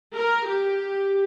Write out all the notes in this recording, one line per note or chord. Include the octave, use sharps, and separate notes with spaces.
A#4
G4